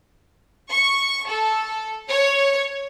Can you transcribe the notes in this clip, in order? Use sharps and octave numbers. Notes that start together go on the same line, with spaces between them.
C#6
A4
C#5